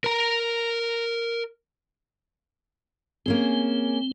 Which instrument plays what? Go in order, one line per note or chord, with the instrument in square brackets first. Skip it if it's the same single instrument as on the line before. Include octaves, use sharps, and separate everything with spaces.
[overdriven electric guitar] A#4 A#5
[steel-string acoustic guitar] A#3 C#4 G#4 [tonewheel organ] C4